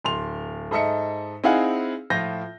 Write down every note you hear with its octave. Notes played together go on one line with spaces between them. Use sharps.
D1 C6 F7
G#2 A4 D#5 E5 C#7
C4 D#4 E4 G#4 F5 F#5
A2 F3 F4 G6 A#6